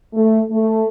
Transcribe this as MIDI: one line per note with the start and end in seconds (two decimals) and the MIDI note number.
0.14 0.40 57
0.50 0.84 57